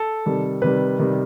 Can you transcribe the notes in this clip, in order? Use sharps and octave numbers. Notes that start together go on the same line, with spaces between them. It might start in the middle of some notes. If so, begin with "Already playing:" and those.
Already playing: A4
C3 D#3 G3
C3 D#3 G3 B4
C3 D#3 G3